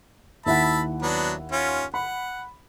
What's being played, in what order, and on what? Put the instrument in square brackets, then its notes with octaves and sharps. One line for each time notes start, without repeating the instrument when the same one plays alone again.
[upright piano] D#2 E4 F#5 [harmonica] E5 A5 B5
[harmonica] F#3 B3 D4
C#4 F4
[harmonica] F#5 [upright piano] B5